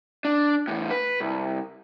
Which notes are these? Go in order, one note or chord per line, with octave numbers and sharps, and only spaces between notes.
D4
E2 A2
B4
C2